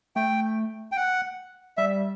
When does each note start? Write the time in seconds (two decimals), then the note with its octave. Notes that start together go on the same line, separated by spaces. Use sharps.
0.16 A3 G5
0.92 G5
0.97 F#5
1.77 G3 E5